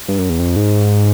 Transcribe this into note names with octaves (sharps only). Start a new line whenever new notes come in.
G2
F#2
E2
F2
G#2